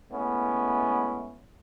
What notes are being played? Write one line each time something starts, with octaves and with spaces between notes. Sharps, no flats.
G#3 A3 B3 C#4 E4